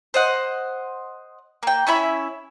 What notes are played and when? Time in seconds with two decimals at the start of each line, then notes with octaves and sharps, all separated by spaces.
0.14 C5 D#5 F#5
1.63 A#3 G5
1.87 C#4 E4 E5 B5